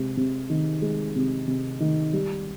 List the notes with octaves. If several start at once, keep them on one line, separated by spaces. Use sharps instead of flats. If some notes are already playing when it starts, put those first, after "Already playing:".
Already playing: C3 G#3
C3
D#3
G#3
C3
C3
D#3
G3